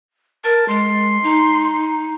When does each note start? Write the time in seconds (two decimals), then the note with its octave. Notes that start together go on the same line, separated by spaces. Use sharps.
0.44 A#4 A5
0.68 G#3 C6
1.24 D#4